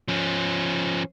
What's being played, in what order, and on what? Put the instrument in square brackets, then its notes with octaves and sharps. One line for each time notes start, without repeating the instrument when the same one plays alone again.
[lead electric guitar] F3 C#4